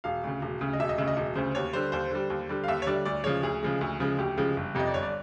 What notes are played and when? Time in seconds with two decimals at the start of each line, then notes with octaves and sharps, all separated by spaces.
0.04 E1 F5
0.24 D2 C#3
0.42 E1
0.61 D2 C#3
0.73 D#5
0.80 E1 E5
0.89 D#5
0.98 D2 C#3 E5
1.08 D#5
1.17 E1
1.36 D2 C#3 C5
1.55 D#2 C#5
1.73 D3 G3 C5
1.92 D#2 C5
2.11 D3 G3
2.30 D#2
2.49 D3 G3
2.64 F5
2.68 D#2 E5
2.82 C#5
2.86 D3 G3 D5
3.05 D2 D5
3.24 C#3 F3 G#3 C#5
3.43 D2 G#4
3.63 C#3 F3 G#3
3.81 D2
4.00 C#3 F3 G#3
4.18 D2 G4
4.38 C#3 F3 G#3
4.57 G1
4.75 F2 C3 D#5
4.87 D5
4.94 G1 C#5
5.03 D5